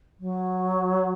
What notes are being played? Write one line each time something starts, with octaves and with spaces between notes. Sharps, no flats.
F#3